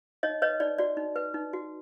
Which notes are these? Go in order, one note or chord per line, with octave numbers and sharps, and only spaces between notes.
D#4 C#5 D#5
B4 C#5 D#5
D#4 D5
F#4 D5
D#4
B4
D#4
F#4